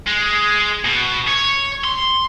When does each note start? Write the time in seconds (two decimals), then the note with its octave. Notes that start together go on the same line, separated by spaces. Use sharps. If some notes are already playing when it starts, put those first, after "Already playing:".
0.07 G#3
0.85 B2
1.28 C#5
1.85 C6